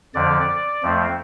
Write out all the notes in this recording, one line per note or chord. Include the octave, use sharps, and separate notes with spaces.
F2 D3 F3 D5
F2 F3 A3 C4